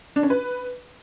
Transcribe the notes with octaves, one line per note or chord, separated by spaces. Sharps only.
D4
C#4
B4